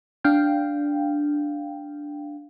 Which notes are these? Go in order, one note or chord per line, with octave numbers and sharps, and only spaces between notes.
D4 F5 G5